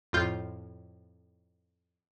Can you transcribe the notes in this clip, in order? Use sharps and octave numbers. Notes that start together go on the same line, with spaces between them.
F2 A2 F4 G6